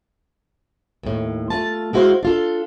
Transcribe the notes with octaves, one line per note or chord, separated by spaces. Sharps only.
D#2 A2
A3 F4 A5
G#3 E4 F#4 B4 C5 F5
D4 F4 A4